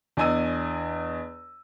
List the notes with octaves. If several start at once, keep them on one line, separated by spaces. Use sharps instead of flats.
E2 D4 D#5 G#5 E6 D#7